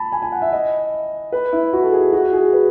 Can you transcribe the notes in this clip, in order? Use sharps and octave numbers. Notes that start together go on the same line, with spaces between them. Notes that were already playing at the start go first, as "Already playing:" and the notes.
Already playing: A5 B5
G#5
G#5
F#5
E5
D#5
B4
E4
F#4
A4
G#4
F#4
G#4
B4